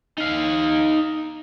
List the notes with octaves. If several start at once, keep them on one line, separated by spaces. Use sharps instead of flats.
D#4 F5